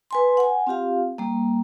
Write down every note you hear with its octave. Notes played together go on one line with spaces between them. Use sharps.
B4 G#5 C6
F#5 G#5
C4 F4 G4 F5
G3 A#3